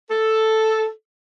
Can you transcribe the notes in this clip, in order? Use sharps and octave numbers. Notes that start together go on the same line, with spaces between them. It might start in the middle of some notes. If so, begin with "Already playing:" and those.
A4